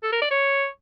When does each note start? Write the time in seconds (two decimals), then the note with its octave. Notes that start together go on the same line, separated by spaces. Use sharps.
0.03 A4
0.12 A#4
0.22 D5
0.31 C#5